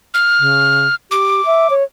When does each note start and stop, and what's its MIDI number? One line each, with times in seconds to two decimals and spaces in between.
0.14 0.95 89
0.39 0.87 49
1.11 1.44 67
1.11 1.74 86
1.46 1.68 76
1.70 1.83 73